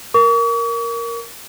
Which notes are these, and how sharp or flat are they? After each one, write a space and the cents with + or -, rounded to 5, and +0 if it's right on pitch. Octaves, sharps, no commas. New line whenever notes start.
A#4 +0 C#6 +45